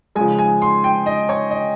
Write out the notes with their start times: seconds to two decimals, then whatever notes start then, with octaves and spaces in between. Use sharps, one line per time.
0.15 G#3 G#5
0.18 C#3 F3
0.39 G#5
0.62 C6
0.84 G5
1.06 D#5
1.29 C#5
1.51 D#5